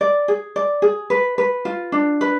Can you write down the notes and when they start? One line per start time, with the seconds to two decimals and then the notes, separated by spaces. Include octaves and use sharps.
0.01 D5
0.28 G#4
0.56 D5
0.82 G#4
1.10 B4
1.38 B4
1.65 F4
1.92 D4
2.21 B4